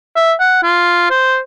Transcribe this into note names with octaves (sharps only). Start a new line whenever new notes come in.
E5
F#5
F4
C5